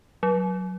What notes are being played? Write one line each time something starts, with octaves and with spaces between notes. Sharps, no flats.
F#3